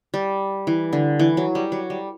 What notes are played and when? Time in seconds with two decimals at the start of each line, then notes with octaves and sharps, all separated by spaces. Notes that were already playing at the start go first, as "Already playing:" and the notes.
0.14 G3
0.67 E3
0.93 D3
1.19 E3
1.37 F#3
1.55 G3
1.72 F#3
1.90 G3